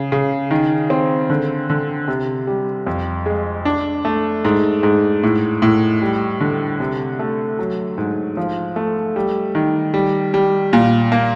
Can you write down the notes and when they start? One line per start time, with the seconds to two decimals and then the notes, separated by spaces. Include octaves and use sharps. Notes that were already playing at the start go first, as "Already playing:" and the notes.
Already playing: C#3
0.12 C#3
0.51 D#3
0.90 C4
1.30 D3
1.70 D3
2.08 C3
2.47 G3
2.87 F2
3.26 G#3
3.65 D4
4.05 A3
4.45 G#2
4.83 G#2
5.23 A2
5.62 A2
6.02 G3
6.41 D3
6.80 C3
7.19 A3
7.59 F#3
7.98 G#2
8.37 F3
8.76 A3
9.16 G3
9.55 D#3
9.94 G3
10.34 G3
10.73 A#2
11.12 A#3